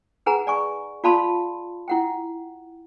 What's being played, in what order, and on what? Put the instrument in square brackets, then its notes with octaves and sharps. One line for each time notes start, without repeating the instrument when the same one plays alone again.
[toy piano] D#4 G#4 B4 F#5 G#5 A#5
D5 G#5 C#6
F4 D5 F5 A5 B5 C6
E4 F#5 G5